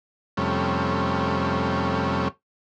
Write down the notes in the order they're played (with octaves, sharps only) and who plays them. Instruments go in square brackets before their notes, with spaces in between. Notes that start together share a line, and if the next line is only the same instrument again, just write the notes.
[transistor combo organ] F2 C3 G3 A3 C#4